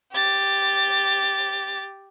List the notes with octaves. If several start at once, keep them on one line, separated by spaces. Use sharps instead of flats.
G4 A6